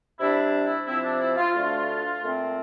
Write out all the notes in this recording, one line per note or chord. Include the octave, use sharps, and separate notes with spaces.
C3 G3 D4 E4
E4
C3 F3 C4 E4
D4
E4
F4
D2 D3 A3 D4 F4
A#2 A3 C4